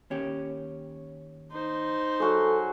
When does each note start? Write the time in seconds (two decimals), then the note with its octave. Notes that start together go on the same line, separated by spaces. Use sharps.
0.10 D#2 C#4 G4
1.51 D#4 C5
2.20 F#3 F#4 G#4 A4